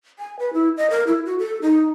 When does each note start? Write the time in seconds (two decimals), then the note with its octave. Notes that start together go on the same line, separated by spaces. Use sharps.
0.19 G#5
0.39 B4
0.53 E4
0.77 D#5
0.90 A#4
1.07 E4
1.26 F#4
1.39 A4
1.62 D#4